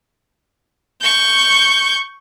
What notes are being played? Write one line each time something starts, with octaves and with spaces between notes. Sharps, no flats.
C#6 G6